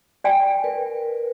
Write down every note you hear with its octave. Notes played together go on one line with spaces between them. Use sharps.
D5 G5 G#5
A#4 B4